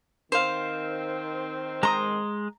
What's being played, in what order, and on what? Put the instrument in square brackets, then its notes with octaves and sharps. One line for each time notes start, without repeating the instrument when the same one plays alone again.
[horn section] D#3 C4 [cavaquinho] C5 F5
[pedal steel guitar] G#3 C6 D#6 [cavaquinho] A#5